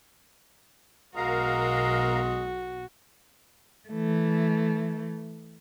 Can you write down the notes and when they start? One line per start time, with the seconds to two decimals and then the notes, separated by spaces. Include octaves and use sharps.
1.16 B1 B2 G#3 F#4 A#4 F5 A#5
3.89 E3 A3